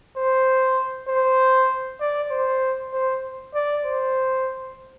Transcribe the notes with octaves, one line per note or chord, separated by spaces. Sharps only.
C5
C5
D5
C5
C5
D5
C5